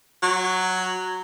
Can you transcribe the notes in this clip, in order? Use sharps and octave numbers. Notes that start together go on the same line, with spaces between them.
F#3